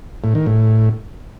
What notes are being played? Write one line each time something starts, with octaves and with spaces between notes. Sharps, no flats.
A2
D#3
A2